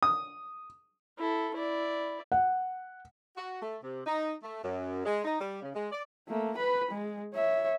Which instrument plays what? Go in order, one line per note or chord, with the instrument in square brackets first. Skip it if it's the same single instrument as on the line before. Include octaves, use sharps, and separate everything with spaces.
[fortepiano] D#6
[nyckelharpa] E4 A4
E4 D5
[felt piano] F#5
[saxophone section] F#4
A3
C3
D#4
A3
F#2
G#3
D#4
G3
C#3
G#3
D5
[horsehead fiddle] A3 A#3
B4 B5
G#3
C#5 E5